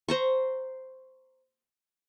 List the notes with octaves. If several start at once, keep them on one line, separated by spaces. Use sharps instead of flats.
C5 A#5 C#6